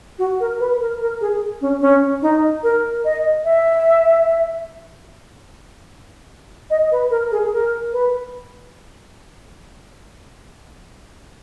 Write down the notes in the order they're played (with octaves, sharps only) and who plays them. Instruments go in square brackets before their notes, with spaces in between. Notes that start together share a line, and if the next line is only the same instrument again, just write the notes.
[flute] F#4
A#4
B4
A#4
A#4
G#4
C#4
C#4
D#4
A#4
D#5
E5
D#5
B4
A#4
G#4
A#4
B4